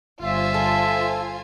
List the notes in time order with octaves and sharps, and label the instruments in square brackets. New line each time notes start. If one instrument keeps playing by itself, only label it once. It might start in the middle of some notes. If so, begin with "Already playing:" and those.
[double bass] G1 [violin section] F4 C5 G#5 [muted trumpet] E5
[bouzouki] A4